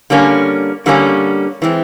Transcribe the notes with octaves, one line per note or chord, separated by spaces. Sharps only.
D3 G3 A#3 C#4
D3 G3 A#3 C#4
E3 G#3 C4